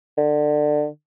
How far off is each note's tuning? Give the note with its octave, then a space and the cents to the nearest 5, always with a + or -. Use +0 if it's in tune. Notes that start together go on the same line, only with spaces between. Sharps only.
D3 +25